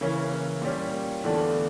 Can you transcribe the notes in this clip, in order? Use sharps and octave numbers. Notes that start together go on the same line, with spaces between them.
C#3 E3 A#3 C#4
A#2 G3 C#4
E2 D3 A3 D4 F4